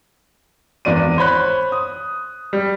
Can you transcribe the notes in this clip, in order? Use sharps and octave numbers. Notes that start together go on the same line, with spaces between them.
G#1 E2 D5 D#7
C5 C#5 B5 F#6
D#6
G3